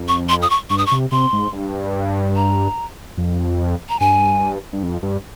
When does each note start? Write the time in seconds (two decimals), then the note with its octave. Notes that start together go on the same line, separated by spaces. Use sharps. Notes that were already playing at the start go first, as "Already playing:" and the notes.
Already playing: F2
0.08 C#6
0.29 C6
0.42 D#6
0.50 C#6
0.70 G2 C#6
0.78 D#6
0.86 C#6
0.92 C3
1.12 C3 C6
1.33 G#2
1.52 G2
2.36 A#5
3.18 F2
3.89 A#5
4.00 G2 G#5
4.73 G2
4.83 F2
5.03 G2